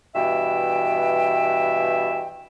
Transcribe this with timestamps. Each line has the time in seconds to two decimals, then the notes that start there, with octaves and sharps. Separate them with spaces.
0.15 G2 B2 E3 E5 G5